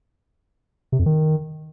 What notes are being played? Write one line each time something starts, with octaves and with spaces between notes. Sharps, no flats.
C3
F2
D#3